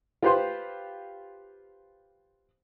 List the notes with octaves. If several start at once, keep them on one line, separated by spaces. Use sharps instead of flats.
F4 G4 B4 C5 C6